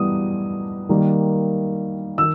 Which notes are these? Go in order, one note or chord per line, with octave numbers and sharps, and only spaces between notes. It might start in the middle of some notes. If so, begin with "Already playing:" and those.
Already playing: E3 G3 B3 D#6
D#3 G3 A#3
D#3 E6